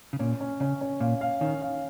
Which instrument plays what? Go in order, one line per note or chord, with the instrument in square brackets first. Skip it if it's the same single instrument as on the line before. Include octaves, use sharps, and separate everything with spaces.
[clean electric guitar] C#3
[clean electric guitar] A#2 [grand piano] C#4
[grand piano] C#4
[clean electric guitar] C#3 [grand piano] C#4
[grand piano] C#4
[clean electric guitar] A#2 [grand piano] F5
[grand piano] F5
[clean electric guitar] D#3 [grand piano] C#4
[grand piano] F5